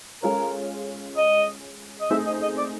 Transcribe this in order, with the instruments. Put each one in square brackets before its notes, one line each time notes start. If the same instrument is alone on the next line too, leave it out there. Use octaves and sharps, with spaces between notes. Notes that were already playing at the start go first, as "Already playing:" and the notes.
[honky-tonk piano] G#3 C#4 F4 A4 C#5 [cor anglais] A#4
[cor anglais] D#5
D#5
[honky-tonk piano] A3 C4 D#4 G#4 C5 [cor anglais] E5
[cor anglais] D#5
D#5
D5